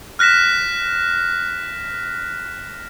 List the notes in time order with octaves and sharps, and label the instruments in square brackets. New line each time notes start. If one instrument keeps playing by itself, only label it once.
[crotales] F6 F#6 A#6 B6 E7